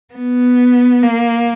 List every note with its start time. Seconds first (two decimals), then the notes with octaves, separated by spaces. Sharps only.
0.14 B3
1.03 A#3